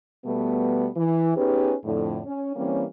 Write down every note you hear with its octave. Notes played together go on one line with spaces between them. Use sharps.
B2 G3 A3 B3
E3
B3 C#4 D#4 G4 G#4 B4
F2 A2 D3
C#4
E3 G3 A#3 C4 C#4